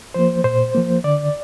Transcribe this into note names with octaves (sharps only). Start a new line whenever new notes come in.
F3 A#3 C5
A#2 C5
F3 A#3
D3 D5